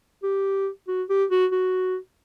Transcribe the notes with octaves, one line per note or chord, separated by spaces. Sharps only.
G4
F#4
G4
F#4
F#4